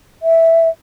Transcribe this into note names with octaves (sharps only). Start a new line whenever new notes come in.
E5